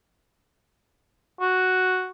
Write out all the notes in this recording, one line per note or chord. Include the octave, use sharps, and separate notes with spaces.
F#4